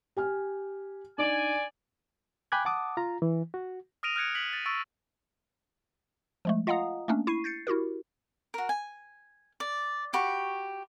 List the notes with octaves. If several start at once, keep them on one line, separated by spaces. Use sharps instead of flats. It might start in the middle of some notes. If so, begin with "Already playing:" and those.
G4 G#5 F6
D4 D#4 D5 G#5
G5 G#5 B5 D6 F#6 G#6
F#5 A5 D6 D#6
F4 A#5
E3
F#4
D#6 F6 A#6 D7 D#7 F7
F6 F#6 G#6 C#7 D7
B6 F#7
A6
C#6 E6 A6 D7
F3 G#3 A3
F4 D#5 F5 F#5 A#5 D#6
A3 A#3 C#4 D4
E4 C#6 C7 D#7
G6 A6 C7 C#7
E4 F#4 G4 A#4
F#4 A#4
G#5
D5
F#4 G4 B5 C#6